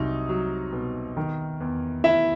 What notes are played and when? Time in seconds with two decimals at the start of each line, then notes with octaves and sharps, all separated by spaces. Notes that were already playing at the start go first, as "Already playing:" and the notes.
Already playing: C2 F#3 D#4
0.29 F#3
0.73 B2
1.17 D#3
1.60 E2
2.03 E2 E4 E5